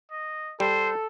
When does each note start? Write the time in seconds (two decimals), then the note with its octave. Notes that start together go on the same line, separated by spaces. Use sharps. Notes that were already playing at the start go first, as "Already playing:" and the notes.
0.11 D#5
0.60 G3 A4 C5